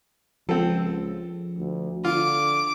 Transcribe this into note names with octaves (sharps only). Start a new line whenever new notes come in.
C#2 F3 C4 A4
D2
D3 F4 D6